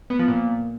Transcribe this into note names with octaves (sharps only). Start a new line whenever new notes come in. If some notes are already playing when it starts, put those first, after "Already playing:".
B3
F3
A#2